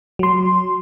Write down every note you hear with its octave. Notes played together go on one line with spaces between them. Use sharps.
F#3 C6